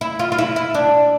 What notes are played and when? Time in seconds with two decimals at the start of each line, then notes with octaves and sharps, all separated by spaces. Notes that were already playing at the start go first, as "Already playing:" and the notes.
0.01 E4
0.19 F4
0.32 F4
0.38 E4
0.56 E4
0.74 D4